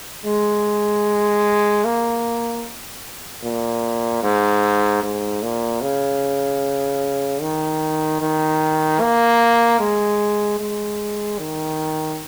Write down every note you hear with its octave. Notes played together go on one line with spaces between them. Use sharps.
G#3
A#3
A#2
G#2
G#2
A#2
C#3
D#3
D#3
A#3
G#3
G#3
D#3